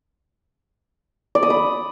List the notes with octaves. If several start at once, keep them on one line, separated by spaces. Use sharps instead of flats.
D5
D#6
B5